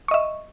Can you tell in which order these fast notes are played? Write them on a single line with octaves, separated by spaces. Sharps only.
C#6 D#5 E5